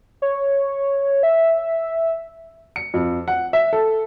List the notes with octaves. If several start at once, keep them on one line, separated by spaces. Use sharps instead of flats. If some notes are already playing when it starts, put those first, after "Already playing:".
C#5
E5
C#7
F2
F#5
E5
A4